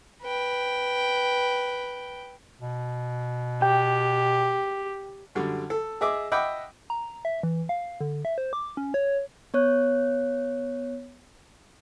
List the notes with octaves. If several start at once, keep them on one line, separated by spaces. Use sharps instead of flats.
B4 G5
B2
G4 G5
F#2 D3 G3
A4
G#4 D#5 E5 D6
D#5 E5 F#5 G5 B5 D6
A#5
E5
E3
F5
D3
E5
C5
D6
C#4
C#5
B3 C#5 F#6